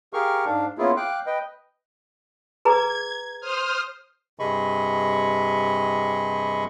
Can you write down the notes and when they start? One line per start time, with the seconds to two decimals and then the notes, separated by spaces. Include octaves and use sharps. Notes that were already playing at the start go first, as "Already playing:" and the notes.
0.13 G4 G#4 A#4 F5 C#6 F6
0.45 G#2 D4 F5
0.78 A#3 B3 C#4 E4 F4 G#4
0.97 F5 G5 D6 F#6
1.26 B4 D#5 G5
2.65 G#4 B4 A#5 G#6
3.40 C5 D#6 F6
4.39 G2 C3 G#4 D#5 B5 C#6